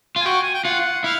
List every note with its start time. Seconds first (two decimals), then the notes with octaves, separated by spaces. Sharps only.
0.16 F4
0.21 G#5
0.25 F#4 G5
0.43 G#5
0.54 G5
0.64 F4 F#5
1.04 E4 F5